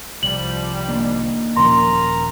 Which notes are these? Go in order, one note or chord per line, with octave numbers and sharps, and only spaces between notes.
C2 F3 G3 F#7
A#3 D4 D#4
D#1 C#3 F3 A#4 A#5 C6